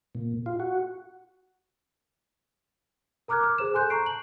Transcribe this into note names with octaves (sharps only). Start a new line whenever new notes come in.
A#2
F4
F#4
A#4 A#5 D6 F6 F#6 G#6
D6 F6
G#4 C5 E7
A4 G#5 C6 F#6 G6
A5 A#5 C#6 G6 C7 D7
A5 F#7